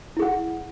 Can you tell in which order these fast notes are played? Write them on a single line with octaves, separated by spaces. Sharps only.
E4 G#4 F#5